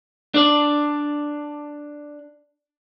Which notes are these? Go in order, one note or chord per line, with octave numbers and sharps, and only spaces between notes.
D4 D5